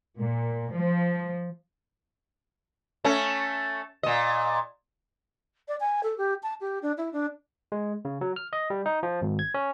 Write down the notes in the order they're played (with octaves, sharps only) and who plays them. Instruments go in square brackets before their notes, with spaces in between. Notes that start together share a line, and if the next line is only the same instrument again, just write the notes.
[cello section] A#2
F3
[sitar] A3 C#4
A#2 D#5
[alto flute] D5
G#5
A4
G4
A5
G4
D4
E4
D4
[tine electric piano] G#3
C#3
F#3
F6
D#5
G3
D#4
F3
G#1
G#6
C#4